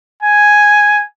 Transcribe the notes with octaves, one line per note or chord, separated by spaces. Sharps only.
G#5